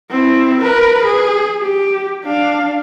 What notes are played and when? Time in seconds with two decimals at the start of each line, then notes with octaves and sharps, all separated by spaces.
0.11 C4 E4
0.62 A#4 B4
1.04 G#4
1.63 G4
2.25 D4 F5